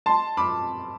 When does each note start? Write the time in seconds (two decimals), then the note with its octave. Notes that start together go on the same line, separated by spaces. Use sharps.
0.06 A5 C6
0.37 B5 D6